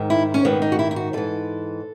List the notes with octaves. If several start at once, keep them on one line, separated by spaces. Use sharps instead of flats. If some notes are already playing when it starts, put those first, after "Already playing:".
Already playing: G#2 D#3
E4
C#4
G#2 D#3 B3
D#4
F#4
E4
E4
F#4
G#2 E3 A4